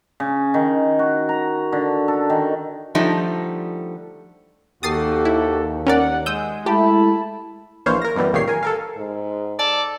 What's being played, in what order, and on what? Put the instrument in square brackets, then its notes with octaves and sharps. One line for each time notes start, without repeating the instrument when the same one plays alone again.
[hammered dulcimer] C#3
D#3
F#4
A#5
D3
A4
D#3
[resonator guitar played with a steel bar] D3 F3 G3 A3 D#4
[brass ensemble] D#2 [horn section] F#4 G4 A4 [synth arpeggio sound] D#6 A6 C7
[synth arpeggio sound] E4
[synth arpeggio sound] C#4 A#4 D5 [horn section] F#5
[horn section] G#3 [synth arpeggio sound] D#6 E6 G6
[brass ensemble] G#3 A3 E4 [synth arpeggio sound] G4 [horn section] A5 B5
[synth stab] A#1 E3 C5 C#5 F5
A#4 A#6
F#2 B2 E3 G3
C#2 A#2 D#3 G4 C#5 C7
A#4 G#5
A4 A#4 F5
[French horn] G#2
[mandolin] A4 [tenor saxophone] D5